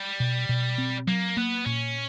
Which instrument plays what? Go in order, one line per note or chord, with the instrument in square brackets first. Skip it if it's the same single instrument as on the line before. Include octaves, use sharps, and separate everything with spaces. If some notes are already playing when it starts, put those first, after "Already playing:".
Already playing: [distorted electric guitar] G3
[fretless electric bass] B2
B2
C4
[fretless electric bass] F#3 [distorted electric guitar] A#3
[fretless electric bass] A#3 [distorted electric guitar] B3
[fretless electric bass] A#2 [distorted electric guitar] C#4